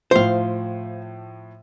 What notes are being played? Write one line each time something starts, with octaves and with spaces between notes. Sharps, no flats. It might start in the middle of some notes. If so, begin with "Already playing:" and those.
A2 F3 C5 F5